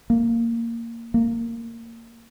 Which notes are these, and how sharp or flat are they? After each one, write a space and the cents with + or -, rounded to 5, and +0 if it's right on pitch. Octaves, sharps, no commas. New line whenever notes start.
A#3 -10
A#3 -20